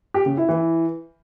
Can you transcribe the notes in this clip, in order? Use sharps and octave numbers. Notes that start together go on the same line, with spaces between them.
G4
C#3
E4
E3